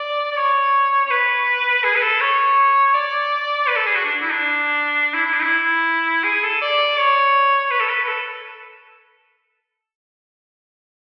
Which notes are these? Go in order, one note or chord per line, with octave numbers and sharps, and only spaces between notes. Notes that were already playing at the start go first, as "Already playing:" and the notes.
Already playing: D5
D5
C#5
C#5
B4
G#4
B4
A4
C#5
D5
B4
A4
G#4
F#4
D4
E4
D4
E4
E4
D4
E4
G#4
A4
D5
C#5
B4
A4
B4
B4
A4